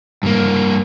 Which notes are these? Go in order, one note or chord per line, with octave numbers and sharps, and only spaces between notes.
G2 A#3